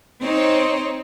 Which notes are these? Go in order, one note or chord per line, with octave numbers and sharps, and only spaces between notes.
C4 D#4 C5 C#5